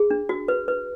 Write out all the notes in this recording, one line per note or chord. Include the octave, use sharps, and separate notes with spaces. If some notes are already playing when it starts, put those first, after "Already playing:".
Already playing: G#4
D4
F#4
B4
B4